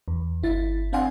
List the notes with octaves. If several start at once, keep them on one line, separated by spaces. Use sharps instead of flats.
E2
G1 E4 A6
C4 D4 F5 F#5 G#5 C6